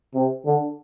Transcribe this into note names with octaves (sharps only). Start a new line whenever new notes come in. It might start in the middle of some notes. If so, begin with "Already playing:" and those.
C3
D3